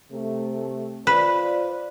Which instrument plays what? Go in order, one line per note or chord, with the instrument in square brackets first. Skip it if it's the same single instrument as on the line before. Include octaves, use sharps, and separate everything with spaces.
[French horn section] C3 A3
[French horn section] F4 C5 D5 [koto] B4